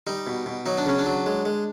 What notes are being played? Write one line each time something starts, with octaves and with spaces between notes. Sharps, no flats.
G3 D#4
B2
B2
F#3 D#4
D4
C#3 C#4
D4
F#3
G#3
G#3